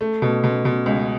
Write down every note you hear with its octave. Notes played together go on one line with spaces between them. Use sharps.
A3
B2
B2
B2
C#2